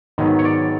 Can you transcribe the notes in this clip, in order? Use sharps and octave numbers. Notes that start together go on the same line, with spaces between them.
G#2 D#3 F#3 B3
C#5
D5